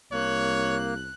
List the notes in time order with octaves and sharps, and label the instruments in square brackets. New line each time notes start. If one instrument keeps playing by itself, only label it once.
[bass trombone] C2 [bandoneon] A#3 [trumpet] C#5 [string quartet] F#6